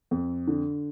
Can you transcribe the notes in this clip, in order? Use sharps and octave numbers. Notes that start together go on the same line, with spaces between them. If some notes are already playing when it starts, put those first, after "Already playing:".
F2
D3